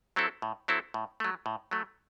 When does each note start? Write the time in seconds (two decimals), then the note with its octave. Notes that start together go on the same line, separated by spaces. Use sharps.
0.16 F#3 C4 E4 A4
0.42 A2
0.68 F#3 C4 E4 A4
0.94 A2
1.20 F#3 A3
1.46 A2
1.71 F#3 A3